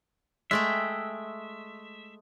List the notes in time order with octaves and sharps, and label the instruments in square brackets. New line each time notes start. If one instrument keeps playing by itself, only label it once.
[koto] G#3 A3 G5 [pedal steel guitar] E5